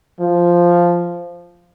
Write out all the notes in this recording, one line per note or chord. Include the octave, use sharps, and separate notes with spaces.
F3